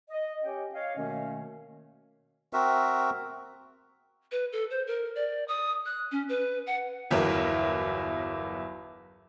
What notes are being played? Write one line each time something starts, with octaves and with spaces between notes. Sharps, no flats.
D#5
C#4 G4 C#5 G5
C#5 D#5 F5
B2 D#3 A3 A#3 C#4
C4 F#4 A#4 E5
B4
A4
C5
A#4
D5
D#6
F#6
C#4
B4
F#5
G1 E2 F#3 E4 A#4